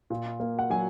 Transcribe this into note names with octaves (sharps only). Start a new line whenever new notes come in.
A#2
A#3
F#5
F#3 G#5